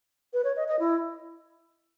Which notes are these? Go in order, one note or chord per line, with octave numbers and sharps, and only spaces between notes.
B4
C#5
D#5
D#5
E4